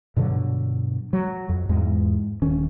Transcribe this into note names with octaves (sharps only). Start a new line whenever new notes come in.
G2 B2 D3 F#3
F#3
F2
E2 G#2 G#3
D#1 D#3 C#4